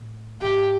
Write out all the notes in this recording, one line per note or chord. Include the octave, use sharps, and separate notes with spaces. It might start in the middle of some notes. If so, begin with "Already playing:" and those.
Already playing: A2
G#2 G4